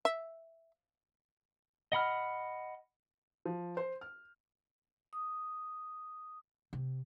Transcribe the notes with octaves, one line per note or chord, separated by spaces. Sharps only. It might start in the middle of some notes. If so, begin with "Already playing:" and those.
E5
D#5 F#5 B5 F6
F3
C5
F6
D#6
C3